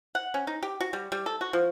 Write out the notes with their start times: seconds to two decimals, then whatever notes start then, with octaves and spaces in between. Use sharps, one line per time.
0.15 F#5
0.34 C#4
0.47 D#4
0.63 G4
0.80 F#4
0.93 G3
1.12 G3
1.26 A4
1.41 F#4
1.53 F3